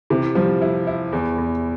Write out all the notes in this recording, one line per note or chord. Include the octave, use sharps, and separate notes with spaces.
C3 E3
F3 G3
E4
E4
E2
E2